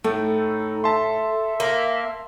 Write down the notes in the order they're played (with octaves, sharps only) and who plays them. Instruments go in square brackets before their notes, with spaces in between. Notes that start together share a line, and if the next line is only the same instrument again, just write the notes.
[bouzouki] A2 [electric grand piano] A3 [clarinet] D#4 [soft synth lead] A4
[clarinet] E5 [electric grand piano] A5 C6
[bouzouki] A#3